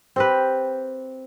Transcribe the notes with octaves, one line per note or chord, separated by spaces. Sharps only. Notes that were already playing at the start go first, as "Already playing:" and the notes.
C4 G4 B4